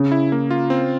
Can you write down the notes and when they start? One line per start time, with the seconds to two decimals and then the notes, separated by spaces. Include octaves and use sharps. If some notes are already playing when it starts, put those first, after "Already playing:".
Already playing: C#3
0.12 E4
0.32 A#3
0.51 F4
0.70 C4